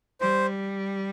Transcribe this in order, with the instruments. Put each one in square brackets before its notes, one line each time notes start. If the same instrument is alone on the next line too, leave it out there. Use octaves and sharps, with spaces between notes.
[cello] G3 [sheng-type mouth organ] C5